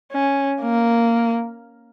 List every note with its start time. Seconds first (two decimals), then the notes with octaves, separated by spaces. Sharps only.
0.12 C#4
0.61 A#3